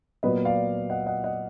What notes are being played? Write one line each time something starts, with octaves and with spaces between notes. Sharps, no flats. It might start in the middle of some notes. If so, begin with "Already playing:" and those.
A#2 F#3 B3 B4 D#5
D5 F5
D#5 F#5
D#5 F#5
D#5 F#5